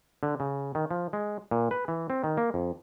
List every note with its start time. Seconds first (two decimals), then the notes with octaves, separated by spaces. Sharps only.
0.23 D3
0.40 C#3
0.75 D#3
0.91 F3
1.13 G#3
1.51 A#2
1.71 B4
1.88 E3
2.10 C4
2.24 D#3
2.37 A#3
2.54 F2